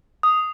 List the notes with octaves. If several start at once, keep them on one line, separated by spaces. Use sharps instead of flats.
D#6